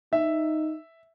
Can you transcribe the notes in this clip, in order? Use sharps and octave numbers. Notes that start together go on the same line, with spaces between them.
D#4 E5